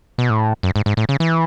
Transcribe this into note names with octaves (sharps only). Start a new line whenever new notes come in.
B2
A2
F#2
G#2
G#2
A2
C#3
E3